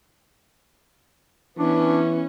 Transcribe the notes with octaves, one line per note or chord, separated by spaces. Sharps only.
E3 B3 C#4 D4